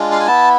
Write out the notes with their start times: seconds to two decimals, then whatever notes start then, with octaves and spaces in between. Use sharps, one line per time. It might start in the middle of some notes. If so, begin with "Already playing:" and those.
Already playing: G#3 D4 F4
0.12 F5
0.20 G#5
0.27 B3 E4 A5